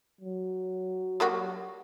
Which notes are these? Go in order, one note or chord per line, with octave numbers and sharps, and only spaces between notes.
F#3
G3 A#3 F#4